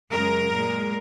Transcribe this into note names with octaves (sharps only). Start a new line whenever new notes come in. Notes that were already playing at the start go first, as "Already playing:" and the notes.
F#2 C#3 G#3 A#4
A#2 G#3